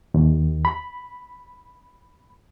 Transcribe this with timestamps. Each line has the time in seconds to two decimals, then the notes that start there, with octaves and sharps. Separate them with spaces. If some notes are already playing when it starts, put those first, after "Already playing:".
0.14 D#2
0.65 B5